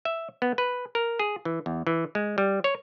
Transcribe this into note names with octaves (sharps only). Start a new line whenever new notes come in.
E5
B3
B4
A#4
G#4
E3
E2
E3
G#3
G3
C#5